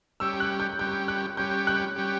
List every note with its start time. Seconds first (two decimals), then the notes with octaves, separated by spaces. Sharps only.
0.20 G3 C#4 G4 E6
0.40 F#6
0.60 G6
0.79 G3 C#4 G4 G6
1.08 F#6
1.37 G3 C#4 G4 G6
1.67 F#6
1.96 G3 C#4 G4